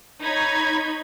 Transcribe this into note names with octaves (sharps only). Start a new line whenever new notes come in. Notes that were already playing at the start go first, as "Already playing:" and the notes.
D#4 C#5 B5 G#6